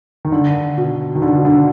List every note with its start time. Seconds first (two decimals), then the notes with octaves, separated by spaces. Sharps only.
0.25 D#3
0.32 D3
0.77 B2
1.15 D#3
1.22 D3
1.33 B2
1.45 D3